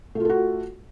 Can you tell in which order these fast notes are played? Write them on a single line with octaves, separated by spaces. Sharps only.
A3 F4 A4 F#4